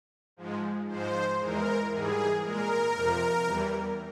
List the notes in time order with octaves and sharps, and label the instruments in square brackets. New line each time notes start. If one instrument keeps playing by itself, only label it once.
[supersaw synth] G#2 F3 G#3
G#2 F3 G#3 C5
E2 E3 G#3 A#4
G#2 E3 G3 G#4
A#2 G#3 A#4
F2 C3 F3
E2 E3 G3